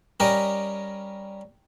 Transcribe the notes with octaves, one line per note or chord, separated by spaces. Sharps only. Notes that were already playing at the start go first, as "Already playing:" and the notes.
G3 C#4 G4 A#4 D#5